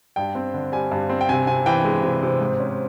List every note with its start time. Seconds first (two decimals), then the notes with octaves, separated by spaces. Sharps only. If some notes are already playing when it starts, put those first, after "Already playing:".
0.16 G2 G5
0.35 C4
0.54 D3
0.72 G3 G#5
0.91 G2
1.09 C4
1.21 G5
1.29 C3 G#5
1.47 C3 G#5
1.66 E3 G5
1.85 G#3
2.03 C3
2.23 C3
2.41 G#2
2.60 C#4